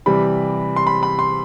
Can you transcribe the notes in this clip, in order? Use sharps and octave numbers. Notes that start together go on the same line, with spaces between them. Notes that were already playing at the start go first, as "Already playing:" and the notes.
C3 E3 G3 B5
C6
B5
B5
C6